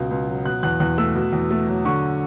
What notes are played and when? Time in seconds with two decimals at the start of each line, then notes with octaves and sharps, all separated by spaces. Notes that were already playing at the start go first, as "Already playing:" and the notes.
Already playing: C#2 B2
0.11 C#2
0.28 F#3
0.45 B2 F#6
0.63 E2 F#6
0.80 E2 F#6
0.98 A3 E6
1.15 B2
1.33 E2
1.51 A3
1.67 F#3
1.85 D3 C#6